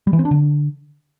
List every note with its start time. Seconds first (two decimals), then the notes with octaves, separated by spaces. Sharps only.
0.07 G3
0.13 E3
0.19 C4
0.25 D4
0.31 D3